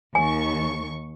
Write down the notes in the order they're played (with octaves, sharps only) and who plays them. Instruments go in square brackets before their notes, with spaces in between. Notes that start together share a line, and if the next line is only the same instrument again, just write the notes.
[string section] D#2 C#6 [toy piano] G#5